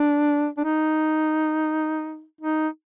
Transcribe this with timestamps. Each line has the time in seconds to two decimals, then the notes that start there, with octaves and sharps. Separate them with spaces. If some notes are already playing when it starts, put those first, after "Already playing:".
Already playing: D4
0.57 D4
0.65 D#4
2.41 D#4